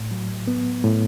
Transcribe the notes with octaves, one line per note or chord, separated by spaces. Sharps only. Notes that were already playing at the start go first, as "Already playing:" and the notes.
Already playing: A2
F#3
B3
A2